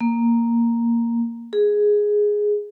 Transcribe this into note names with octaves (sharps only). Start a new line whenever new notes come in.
A#3
G#4